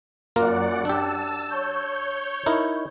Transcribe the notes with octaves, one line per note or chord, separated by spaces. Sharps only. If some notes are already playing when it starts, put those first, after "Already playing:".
F#2 A#3 F4 A#4 D5 F#5
D4 G4 A5 E6
C#5 G6
D#4 E4 A#4